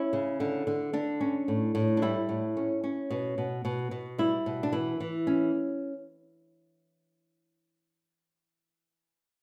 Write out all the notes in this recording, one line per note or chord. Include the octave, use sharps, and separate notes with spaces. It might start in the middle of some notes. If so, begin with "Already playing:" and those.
Already playing: C#4 E4
C#3
D3
D3
D3 D4
C#4
A2
A2
D4
G3 E4
A2
C#4
C#4
B2
B2
B2
B2
G3 E4
B2
D4
E3 E4
E3
C#4